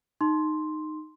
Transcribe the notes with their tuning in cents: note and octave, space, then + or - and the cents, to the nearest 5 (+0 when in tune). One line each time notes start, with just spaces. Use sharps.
D#4 -10 C6 +0